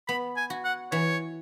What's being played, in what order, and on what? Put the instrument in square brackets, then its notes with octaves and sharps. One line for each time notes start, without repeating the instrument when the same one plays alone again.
[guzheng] B3 [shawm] B5
[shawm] G#5
[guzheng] F#4
[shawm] F#5
[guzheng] E3 [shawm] C#5